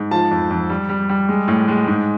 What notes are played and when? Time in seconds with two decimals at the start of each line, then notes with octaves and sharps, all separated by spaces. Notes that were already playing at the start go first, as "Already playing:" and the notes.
Already playing: G#2
0.11 F3 A5
0.31 F2
0.50 F2
0.70 G3
0.89 G3
1.09 G3
1.29 G#3
1.48 A2
1.68 G#3
1.87 G#2